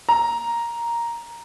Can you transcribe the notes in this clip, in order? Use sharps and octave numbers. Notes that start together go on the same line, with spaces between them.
A#5